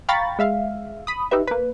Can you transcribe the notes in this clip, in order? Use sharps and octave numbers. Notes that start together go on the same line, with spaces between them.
F5 G5 A#5 B5 C#6 A6
G#3 E5 F5
B5 D#6
D#4 G4 B4 E5
A#3 B4